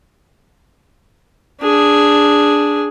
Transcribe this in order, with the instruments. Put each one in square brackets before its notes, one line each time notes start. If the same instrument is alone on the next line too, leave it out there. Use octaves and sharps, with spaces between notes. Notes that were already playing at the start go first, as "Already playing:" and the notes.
[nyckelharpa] D4 G#4